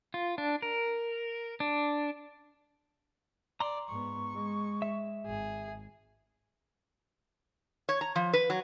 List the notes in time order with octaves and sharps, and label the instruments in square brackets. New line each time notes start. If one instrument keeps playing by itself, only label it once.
[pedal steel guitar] F4
D4
A#4
D4
[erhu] D5 [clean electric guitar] A#5 C6
[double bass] G#2 B3 [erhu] C#6
[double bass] G#3
[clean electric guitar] E5
[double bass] G#1 [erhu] G#4
[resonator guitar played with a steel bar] C#5
A#5
F3
B4
F#3